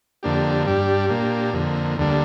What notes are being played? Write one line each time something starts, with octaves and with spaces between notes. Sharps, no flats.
F2 D3 A#3 D4 G4
G2 G3 D4 G4
A#2 A#3 D4 G4
F2 D3 A#3
D2 D3 G3 A#3 D4